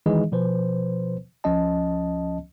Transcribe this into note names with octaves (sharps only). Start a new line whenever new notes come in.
D#3 E3 G#3 D#4 G#4 D#5
B2 F3 B4 C5
C#2 F3 C#4 D#5 A5